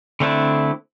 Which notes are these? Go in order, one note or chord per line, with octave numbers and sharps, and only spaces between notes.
D3 A3 C4 D4 E4